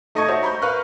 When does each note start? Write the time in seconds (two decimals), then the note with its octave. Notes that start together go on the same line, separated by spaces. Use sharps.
0.15 A3 D#4 D#5 A5 C#6 G#6
0.28 F#4 C5 C#5 E5
0.43 A#5 B5 C#6 G6
0.62 A#4 B4 F5 C#6 F6 F#6